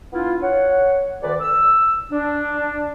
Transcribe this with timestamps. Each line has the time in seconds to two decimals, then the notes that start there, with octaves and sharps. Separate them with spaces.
0.13 B3 D4 E4 F4
0.43 C#5 F#5
1.23 D2 D#3 B4 D5
1.41 E6
2.12 D4